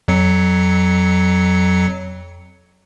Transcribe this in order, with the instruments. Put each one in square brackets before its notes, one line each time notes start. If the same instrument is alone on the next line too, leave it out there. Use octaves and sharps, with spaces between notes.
[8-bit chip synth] F2 F#3 C#7